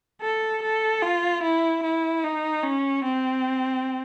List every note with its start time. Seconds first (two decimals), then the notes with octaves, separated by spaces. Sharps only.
0.22 A4
0.62 A4
1.03 F4
1.43 E4
1.83 E4
2.24 D#4
2.63 C#4
3.04 C4